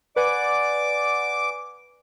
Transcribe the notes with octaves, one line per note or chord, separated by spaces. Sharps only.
B4 D5 F#5 G#5 D6